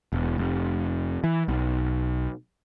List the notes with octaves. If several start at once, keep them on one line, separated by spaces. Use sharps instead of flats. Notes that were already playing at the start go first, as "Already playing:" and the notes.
E1
F1
E3
B1